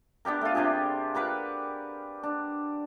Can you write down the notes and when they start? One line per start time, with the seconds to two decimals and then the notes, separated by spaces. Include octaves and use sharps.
0.25 B3 D4 G4 A#4
0.41 A3 F4
0.55 C3 D4 G4 G#4
1.15 G4 A#4 B4 F#5
2.23 D4